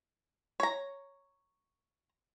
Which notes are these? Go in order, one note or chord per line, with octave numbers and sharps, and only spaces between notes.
C#5 A#5